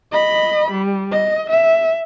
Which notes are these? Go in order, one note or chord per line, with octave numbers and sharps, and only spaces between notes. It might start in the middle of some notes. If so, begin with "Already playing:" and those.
D#5 B5
G3
D#5
E5